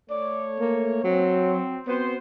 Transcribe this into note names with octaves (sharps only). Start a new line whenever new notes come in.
A3 C#5 D5
A#3
F#3 C4
B3 C4 F#4 C5